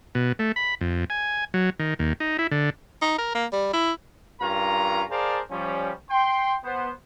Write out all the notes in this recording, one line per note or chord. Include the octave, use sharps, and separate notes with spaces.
B2
A3
B5
F2
G#5
F#3
D#3
D#2
D#4
E4
D3
D#4
A#4
A#3
G3
E4
G2 C#4 F4 A#4 A#5
G#4 A#4 C5 D5 F5 A5
F3 G3 C#4
G5 C6
B3 C5